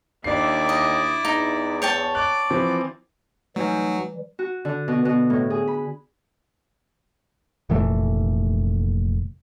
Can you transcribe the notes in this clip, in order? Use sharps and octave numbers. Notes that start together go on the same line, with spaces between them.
D#2 D4 E4 D5 C7
D#5
E2 D#4
C#5 G5 A5
D5 F#6
E3 F3 C4
E3 F#3 G3 A3 D#4 G#5
F#4
D3
B2
B2
A2
G#4
B5
F1 A#2 E3 A3